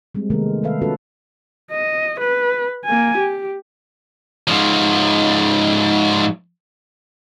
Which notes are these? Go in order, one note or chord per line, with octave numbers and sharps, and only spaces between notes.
G3 G#3 C4
C3 D#3 G#3 A3 B3 A#4
D#3 A4 B4 E5 F5
B3 C#4 F4 F#4 A4 B4
D#5
B4
A#3 G#5
G4
G#2 F3